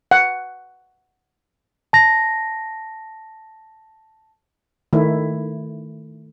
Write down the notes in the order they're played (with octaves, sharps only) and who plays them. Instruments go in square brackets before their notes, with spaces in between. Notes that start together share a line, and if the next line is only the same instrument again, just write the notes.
[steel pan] F#5
[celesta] A5 A#6
[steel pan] D#3 A3 E4